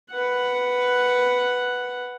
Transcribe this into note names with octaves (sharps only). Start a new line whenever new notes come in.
B4 F#5